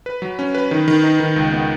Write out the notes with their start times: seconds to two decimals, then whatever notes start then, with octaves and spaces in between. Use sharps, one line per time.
0.06 B4
0.22 F#3
0.39 C#4
0.55 B4
0.71 D#3
0.88 D#3
1.03 D#4
1.20 D#3
1.36 C#2
1.52 B3